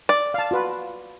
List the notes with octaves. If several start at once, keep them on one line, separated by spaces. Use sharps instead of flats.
D5
F5 A5
F4 F#4 B4